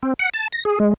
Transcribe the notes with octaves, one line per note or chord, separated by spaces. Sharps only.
C4
F#5
A5
A#6
G#4
G#3